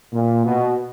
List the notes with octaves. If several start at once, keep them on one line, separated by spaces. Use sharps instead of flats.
A#2
B2